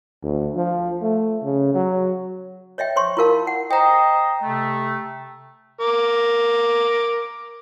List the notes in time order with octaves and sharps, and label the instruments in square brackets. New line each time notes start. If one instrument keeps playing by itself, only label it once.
[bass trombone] D2
F3
A3
C#3
F#3
[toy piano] C#5 D#5 E5 G5
C5 C#5 C6 C#6
E4 F4 A#4 F5 A5
F#5
[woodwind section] C5 D#5 [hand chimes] G5 A#5
[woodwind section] C3 A3
[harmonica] A#4 D6